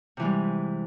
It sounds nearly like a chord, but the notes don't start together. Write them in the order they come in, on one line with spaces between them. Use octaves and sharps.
C3 E3 G#3 G3